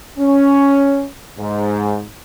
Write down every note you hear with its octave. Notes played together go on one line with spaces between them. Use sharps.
C#4
G#2